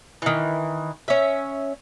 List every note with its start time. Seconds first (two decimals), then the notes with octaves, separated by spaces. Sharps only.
0.22 D#3 E3
1.08 C#4 E5